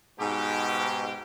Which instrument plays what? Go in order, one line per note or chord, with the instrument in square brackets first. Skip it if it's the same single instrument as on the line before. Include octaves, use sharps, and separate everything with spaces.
[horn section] G#2 B2 G4